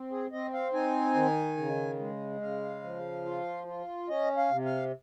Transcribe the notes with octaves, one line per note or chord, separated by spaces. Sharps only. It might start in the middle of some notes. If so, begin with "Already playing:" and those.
Already playing: C4
G#4
C4 D#5
F5
D#4 G#5
D#3
C#3
G#3
C#3 F5
F3
F4
F4
C#4 D#5
F5
C3
F5